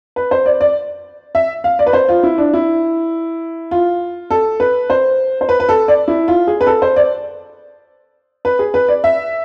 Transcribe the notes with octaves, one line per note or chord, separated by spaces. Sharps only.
B4
C5
D5
D5
E5
F5
D5
B4
C5
F4
E4
D4
E4
F4
A4
B4
C5
C5
B4
B4
A4
D5
E4
F4
G#4
B4
A4
C5
D5
B4
G#4
B4
D5
E5